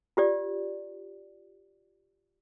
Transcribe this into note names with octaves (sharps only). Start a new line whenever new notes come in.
F4 G4 D5